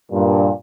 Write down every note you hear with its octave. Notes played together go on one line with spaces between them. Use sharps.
G2 A#2